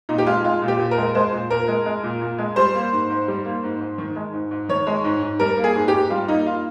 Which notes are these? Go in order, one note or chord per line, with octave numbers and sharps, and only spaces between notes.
A#2 D#4
G4
G#3 F4
G#3 F4
A#2
G4
A#2
A#4
G#3
G#3 C5
A#2
A#2 A#4
G#3
G#3
A#2
A#2
G#3
G3 C5
A#3
G#2
G#2
G3
A#3
G#2
G#2
D#3
G#3
G#2
G#2
D#3 C#5
G#3
G#2
G#2
G3 A#4
A#3
G#4
G#2
G4
G#2
G3 F4
A#3 D#4
F4